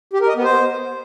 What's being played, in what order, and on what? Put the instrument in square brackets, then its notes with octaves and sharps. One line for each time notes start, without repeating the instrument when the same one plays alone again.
[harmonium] G4
A#4
D#5
B3
C5